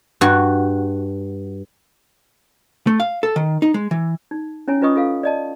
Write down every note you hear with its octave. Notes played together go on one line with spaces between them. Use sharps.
G2 F#4
A3
F5
A4
D#3
D#4
G#3
E3
D#4
C#4 E4 C#5 G#5
C#4 F4 B4 D#5 C#6 D#6
F4 A4 F5
D5 D#5 A5